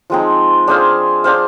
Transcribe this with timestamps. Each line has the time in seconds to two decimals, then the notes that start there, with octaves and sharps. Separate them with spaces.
0.10 F3 G#3 C4 D#4
0.67 D4 G#4 C5 F5
1.24 D4 G#4 C5 F5